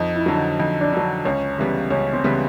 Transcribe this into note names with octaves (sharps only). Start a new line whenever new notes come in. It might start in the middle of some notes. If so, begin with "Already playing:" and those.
Already playing: F2 D#4
E4
D3 F#3
D#4
F2 D#4
D4
D3 F#3
C#2 C#4
C#3 E3 G3 B3
C#2 C#4
C4
C#3 E3 G3 B3